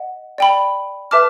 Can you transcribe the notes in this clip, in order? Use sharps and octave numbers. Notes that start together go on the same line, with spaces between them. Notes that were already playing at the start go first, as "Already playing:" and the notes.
Already playing: D#5 F#5
D5 G5 B5
B4 E5 A5 D6 F6